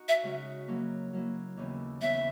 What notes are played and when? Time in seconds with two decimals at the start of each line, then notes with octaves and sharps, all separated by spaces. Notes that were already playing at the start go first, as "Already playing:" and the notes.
Already playing: D#4 F#4
0.08 E5
0.23 C#3 G#3 D#4 F#4
0.68 F#3 A#3 E4
1.13 F#3 A#3 E4
1.57 D#2 C#3 E3 B3
2.02 D#2 C#3 E3 B3 E5